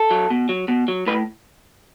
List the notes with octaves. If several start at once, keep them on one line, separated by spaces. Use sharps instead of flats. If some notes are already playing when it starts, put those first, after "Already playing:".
Already playing: A4
F#3
B2
F#3
B2
F#3
A2 B4